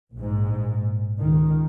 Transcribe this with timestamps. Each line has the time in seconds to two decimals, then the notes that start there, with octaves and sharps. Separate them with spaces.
0.14 A#1 G#2
1.19 C#2 D#3